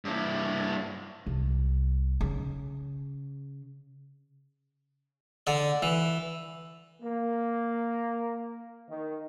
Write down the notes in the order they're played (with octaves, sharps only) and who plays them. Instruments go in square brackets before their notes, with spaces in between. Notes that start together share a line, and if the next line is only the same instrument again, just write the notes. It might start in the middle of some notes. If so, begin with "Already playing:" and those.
[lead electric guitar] G2 E4
[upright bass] C2
C#3
[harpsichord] D3 D5
E3
[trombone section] A#3
D#3